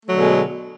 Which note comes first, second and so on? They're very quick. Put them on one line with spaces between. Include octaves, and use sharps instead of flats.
A3 F#3 D3 B2 G#3